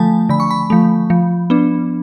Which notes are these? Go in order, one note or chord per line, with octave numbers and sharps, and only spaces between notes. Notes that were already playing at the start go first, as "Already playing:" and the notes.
Already playing: D3 F3 A3 G#5 A5
D3 B5
C#6
B5
F3 A3
F3
B3 D4